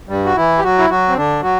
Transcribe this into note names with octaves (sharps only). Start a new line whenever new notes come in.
G2 G3
F#4
E3 E4
G4
F#3 F#4
E4
F#3 F#4
C4
D3 D4
F#3 F#4